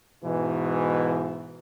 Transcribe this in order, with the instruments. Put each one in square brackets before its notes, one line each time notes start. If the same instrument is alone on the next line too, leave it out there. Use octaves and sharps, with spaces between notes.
[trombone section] G#2 B2 E3